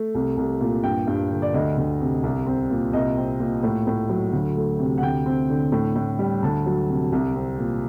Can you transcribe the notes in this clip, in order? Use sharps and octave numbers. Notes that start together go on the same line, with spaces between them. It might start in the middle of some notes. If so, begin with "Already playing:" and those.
Already playing: A3
C2
C2
A#2
G2 G5
G2
D3
D5
D2 D#5
D2
C3
C2
C4
A#2
C2 D#5
C4
A#2
A2
A2
F#3
D2
A3
C3
F#5
D2 G5
C4
D3
A2
A2
G3
D2 A5
F#3
C3
C2
C4
A#2